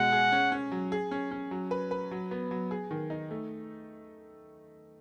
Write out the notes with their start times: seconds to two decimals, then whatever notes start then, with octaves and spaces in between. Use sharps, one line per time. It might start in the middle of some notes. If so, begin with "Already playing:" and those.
Already playing: B2 G#3 F#5
0.12 G#4
0.32 C#4
0.52 C#4
0.72 F#3
0.92 G#4
1.11 C#4
1.31 C#4
1.51 F#3
1.71 B4
1.91 B4
2.11 F#3
2.31 B3
2.51 F#3
2.71 G#4
2.91 D#3
3.10 D#4
3.31 A3